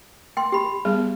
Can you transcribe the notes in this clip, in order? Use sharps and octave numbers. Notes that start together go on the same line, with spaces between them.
G5 C6
G4 B5
G3 B3 G#4